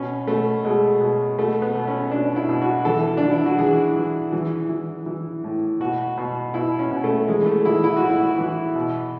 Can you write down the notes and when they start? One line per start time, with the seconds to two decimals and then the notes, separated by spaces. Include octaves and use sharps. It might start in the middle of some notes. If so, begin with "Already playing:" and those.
Already playing: B2 C#4
0.27 B2 A3
0.65 B2 G#3
1.01 B2
1.39 B2 A3
1.62 B3
1.75 B2
1.87 C#4
2.11 B2 D4
2.36 E4
2.49 B2
2.61 F#4
2.85 E3 A4
3.17 E3 D4
3.31 E4
3.46 F#4
3.59 E3 G#4
3.96 E3
4.32 E3
4.69 E3
5.06 E3
5.44 A2
5.80 B2 F#4
6.18 B2
6.54 B2 E4
6.79 C#4
6.91 B2
7.04 A3
7.28 E3 G#3
7.46 A3
7.65 E3 E4
7.84 E4
7.96 F#4
8.02 A2
8.10 E4
8.38 E3
8.76 B2